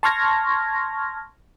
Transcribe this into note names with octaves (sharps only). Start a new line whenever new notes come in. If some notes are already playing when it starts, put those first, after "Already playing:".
A5 C6 C#6 F6 G#6 A#6